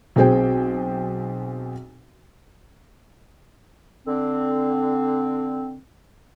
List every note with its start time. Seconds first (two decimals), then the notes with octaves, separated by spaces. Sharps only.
0.16 B1 C4 G#4 C5 G5
4.07 D3 C4